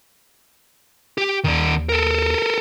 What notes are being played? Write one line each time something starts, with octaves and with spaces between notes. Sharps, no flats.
G4
D#2 D#3 D5
A4 A#4